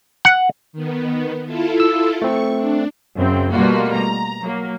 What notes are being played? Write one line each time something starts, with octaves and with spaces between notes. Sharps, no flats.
F#5
D#3 B3
E4 F4 A4
E6
A3 C4 C#6
D4
F#2 C#3 C4
B2 G3 A3 A#3 F4 F#4
A#5
F#3 A#3